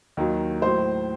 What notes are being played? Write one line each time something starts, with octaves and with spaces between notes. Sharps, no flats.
D#2 D#3 F#3
A2 F#3 C5